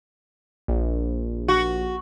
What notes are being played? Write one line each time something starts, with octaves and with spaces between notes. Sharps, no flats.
A#1
F#4